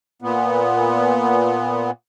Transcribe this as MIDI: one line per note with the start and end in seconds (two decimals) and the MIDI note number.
0.22 1.91 46
0.22 1.91 59